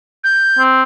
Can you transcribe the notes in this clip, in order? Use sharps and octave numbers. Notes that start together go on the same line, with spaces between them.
G6
C4